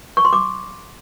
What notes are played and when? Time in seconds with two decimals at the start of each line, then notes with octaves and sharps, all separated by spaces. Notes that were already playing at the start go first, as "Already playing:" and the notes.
0.17 C#6
0.25 C6
0.33 D6